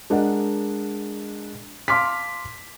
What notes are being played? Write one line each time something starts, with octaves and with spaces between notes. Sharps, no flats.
G#3 D4 A#4 D#5 F#5
F5 A5 C6 D6 F6 B6